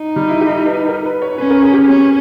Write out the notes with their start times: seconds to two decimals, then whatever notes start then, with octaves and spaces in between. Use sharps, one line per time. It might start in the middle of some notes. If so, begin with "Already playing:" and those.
Already playing: D#4
0.16 G3
0.28 E4
0.41 G4
0.65 B4
0.89 A#4
1.06 B4
1.22 C#5
1.37 C#4 B4
1.50 A#4
1.62 G#4
1.73 G4
1.86 C#4